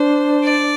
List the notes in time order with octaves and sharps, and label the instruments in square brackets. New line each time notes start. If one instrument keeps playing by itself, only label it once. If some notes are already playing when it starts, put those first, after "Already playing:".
Already playing: [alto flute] D4 [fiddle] C5
[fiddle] D5